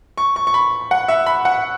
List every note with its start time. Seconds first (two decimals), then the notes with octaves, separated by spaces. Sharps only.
0.18 C#6
0.36 C#6
0.47 C#6
0.54 B5
0.91 F#5
1.08 E5
1.26 B5
1.45 F#5